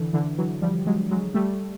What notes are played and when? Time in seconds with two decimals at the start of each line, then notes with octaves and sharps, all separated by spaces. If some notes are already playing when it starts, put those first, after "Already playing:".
Already playing: D3 E3
0.13 D3 E3
0.38 E3 F#3
0.62 F3 G3
0.87 F#3 G#3
1.11 F#3 G#3
1.34 G3 A3